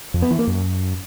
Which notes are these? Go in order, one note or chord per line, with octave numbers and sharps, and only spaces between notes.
F2
B3
E3
A#3
F#2